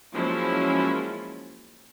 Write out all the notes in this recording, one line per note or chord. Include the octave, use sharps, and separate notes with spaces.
F3 F#3 G#3 A#3 C#4 E4